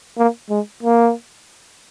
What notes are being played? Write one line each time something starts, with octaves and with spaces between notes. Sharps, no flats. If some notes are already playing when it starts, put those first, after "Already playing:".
A#3
G#3
A#3